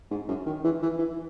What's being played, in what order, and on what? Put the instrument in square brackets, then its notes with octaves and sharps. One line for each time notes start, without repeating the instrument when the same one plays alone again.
[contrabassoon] G#2
F#2
D#3
E3
E3
E3